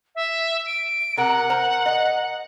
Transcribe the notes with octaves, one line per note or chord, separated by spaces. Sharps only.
E5
D7
C3 A#4 F#5
A#4 C5 A#5
D#5